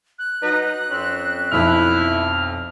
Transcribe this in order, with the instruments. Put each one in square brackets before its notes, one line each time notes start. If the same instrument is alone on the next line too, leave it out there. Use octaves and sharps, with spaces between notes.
[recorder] F#6
[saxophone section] F#3 D#4 B4
F2 C4 C#4
[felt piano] B1 F2 [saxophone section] E4 [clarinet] F6